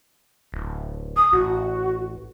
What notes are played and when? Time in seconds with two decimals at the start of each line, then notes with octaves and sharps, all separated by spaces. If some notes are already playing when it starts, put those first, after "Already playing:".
0.52 D1
1.16 D#6
1.32 A1 F#4